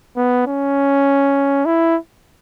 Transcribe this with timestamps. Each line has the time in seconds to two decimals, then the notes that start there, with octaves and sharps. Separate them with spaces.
0.17 B3
0.47 C#4
1.66 E4